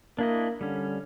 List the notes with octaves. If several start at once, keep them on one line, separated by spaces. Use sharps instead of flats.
A#3 D4 E4 D#5
D3 G3 C#4